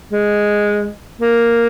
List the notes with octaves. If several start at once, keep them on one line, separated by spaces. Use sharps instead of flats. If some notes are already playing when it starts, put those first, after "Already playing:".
G#3
A#3